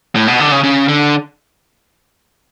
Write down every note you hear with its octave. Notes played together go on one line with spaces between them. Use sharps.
A2
B2
D3
C#3
C#3
D3